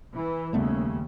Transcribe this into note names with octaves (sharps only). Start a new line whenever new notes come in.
E3
D#2 C#3 G3 A3 B3